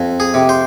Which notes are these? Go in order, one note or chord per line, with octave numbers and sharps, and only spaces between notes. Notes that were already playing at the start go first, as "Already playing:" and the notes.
Already playing: F2
G#4
C3
C5